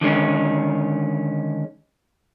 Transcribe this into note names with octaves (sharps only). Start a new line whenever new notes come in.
D3 D#3 G#3 C#4